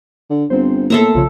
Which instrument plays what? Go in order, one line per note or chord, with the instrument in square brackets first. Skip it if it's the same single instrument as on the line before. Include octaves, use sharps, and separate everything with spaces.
[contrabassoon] D3
[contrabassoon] G1 [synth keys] C4 C5
[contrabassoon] A2 [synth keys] A#3 B3 C6 [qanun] A4 E5 A#5
[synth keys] B1 C#3 C#5 [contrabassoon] F3